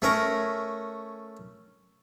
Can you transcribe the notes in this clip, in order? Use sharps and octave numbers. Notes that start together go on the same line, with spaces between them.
A3 C#4 A#4